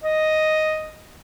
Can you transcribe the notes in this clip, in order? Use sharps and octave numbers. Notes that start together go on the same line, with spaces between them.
D#5